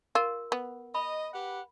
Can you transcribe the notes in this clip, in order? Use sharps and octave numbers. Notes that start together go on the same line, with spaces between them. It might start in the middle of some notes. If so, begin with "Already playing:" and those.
F4 A#4
B3
D#5 B5
G4 B4 F#5